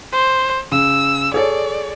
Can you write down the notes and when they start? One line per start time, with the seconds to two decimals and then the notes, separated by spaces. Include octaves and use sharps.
0.12 C5
0.72 C#3 E6
1.34 G#4 A4 C#5 D5